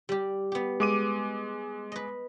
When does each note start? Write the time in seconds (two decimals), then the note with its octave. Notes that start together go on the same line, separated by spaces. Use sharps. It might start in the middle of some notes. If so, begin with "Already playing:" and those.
0.09 G3 G4
0.52 B3 G4
0.80 G#3 D6 D#7
1.92 B4 D#5